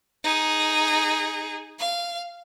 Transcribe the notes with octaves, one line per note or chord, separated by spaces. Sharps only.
D#4 G#4
F5